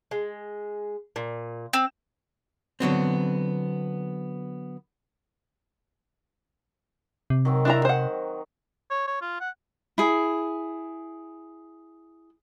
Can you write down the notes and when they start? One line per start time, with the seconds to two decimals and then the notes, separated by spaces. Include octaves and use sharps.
0.11 G#3
1.16 A#2
1.73 C4
2.80 D3 F#3 B3 C4
7.30 C3
7.45 D#3 F#3 C4
7.65 D4 E4 A#5
7.85 C5 F#5
8.90 C#5
9.08 C#5
9.22 F4
9.40 F#5
9.98 E4 G#4